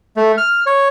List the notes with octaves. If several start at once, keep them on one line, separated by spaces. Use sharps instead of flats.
A3
F6
C#5